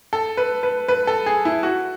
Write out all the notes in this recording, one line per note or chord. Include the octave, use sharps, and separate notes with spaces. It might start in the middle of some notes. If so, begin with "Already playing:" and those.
A4
B4
B4
B4
A4
G#4
E4
F#4